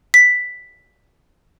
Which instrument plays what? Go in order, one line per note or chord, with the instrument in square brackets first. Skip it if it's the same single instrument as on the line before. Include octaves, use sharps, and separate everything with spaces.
[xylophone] B6